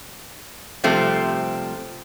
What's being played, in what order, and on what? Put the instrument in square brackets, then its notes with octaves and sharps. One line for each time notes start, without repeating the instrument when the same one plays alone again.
[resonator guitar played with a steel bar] C3 F3 G3 A3 C4